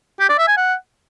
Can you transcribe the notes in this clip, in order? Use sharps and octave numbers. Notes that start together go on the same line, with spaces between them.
G4
D5
E5
G#5
F#5